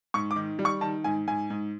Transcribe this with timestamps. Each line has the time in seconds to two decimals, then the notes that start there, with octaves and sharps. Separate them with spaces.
0.14 G#2 C#6
0.31 D6
0.36 D#3
0.59 G3
0.65 C#6
0.81 D#3 A5
1.04 G#2 G#5
1.27 G#2 G#5
1.50 G#2